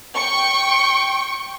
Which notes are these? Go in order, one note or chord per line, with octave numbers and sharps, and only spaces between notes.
G5 C#6